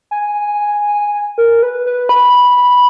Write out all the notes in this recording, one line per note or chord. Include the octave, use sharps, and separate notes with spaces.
G#5
A#4
B4
B4
B5